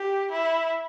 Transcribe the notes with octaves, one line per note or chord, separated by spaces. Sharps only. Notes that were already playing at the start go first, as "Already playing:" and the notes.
Already playing: G4
E4